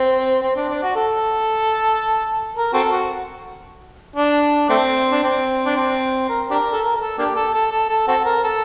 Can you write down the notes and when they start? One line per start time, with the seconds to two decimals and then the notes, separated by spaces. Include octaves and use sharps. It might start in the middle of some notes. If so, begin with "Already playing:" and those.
Already playing: C4
0.42 C4
0.56 D4
0.69 D4
0.83 F#4
0.96 A4
2.56 A#4
2.73 C4 F#4 A4
2.91 F#4
4.16 D4
4.69 A3 C4
5.11 D4
5.23 C4
5.66 D4
5.76 C4
6.29 A#4
6.50 D4 G4 A#4
6.73 A4
6.82 A#4
6.96 A#4
7.00 A4
7.18 A#3 D4 G4
7.36 A4
7.54 A4
7.71 A4
7.89 A4
8.08 C4 F#4 A4
8.25 A#4
8.43 A4